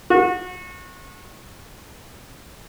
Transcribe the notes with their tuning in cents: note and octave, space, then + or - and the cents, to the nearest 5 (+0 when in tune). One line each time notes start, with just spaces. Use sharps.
F#4 -30